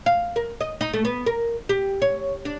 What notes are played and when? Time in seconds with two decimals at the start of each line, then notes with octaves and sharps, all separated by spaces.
0.06 F5
0.36 A#4
0.61 D#5
0.81 D#4
0.93 A3
1.05 B3
1.26 A#4
1.69 G4
2.02 C#5
2.45 D4